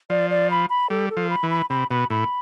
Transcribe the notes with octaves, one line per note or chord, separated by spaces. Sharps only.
F3 D5
D5
B5
B5
G3 A4
A4
F3
B5
E3
B5
C3 B5
B2 B5
A2 B5